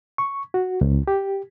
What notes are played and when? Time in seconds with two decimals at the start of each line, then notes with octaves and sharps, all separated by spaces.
0.18 C#6
0.54 F#4
0.81 C#2
1.08 G4